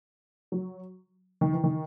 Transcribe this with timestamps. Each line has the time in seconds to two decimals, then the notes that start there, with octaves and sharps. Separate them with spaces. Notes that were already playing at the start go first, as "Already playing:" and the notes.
0.52 F#3
1.41 D#3
1.53 E3
1.64 D#3